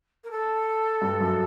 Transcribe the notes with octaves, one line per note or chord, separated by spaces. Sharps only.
A#4
A4
G2
F#2